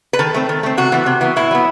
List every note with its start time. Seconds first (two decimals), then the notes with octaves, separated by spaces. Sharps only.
0.13 B4
0.19 D#3 A4
0.34 A3 C4
0.49 D#3
0.63 A3 C4
0.77 C3 F#4
0.92 E3 B3
1.06 C3
1.21 E3 B3
1.36 A2 E4
1.51 F#3 B3